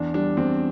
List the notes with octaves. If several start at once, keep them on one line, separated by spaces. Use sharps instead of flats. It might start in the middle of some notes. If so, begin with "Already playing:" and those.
Already playing: E2 D4
G3 D4
E2 C4